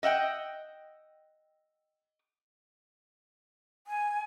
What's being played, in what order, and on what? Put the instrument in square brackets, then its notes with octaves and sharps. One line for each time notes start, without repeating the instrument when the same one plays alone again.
[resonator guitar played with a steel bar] D#5 E5 F#5 G5
[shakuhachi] G#5